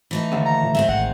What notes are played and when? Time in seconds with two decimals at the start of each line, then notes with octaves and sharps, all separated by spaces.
0.11 E3 A3 D#4
0.32 D#2 D3
0.46 A#5
0.63 A#2
0.75 G#2 D#3 G#3 C4 E5
0.89 A1 F#5